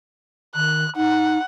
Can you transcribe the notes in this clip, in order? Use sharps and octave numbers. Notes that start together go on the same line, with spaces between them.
D#3 F#6
D#4 F#5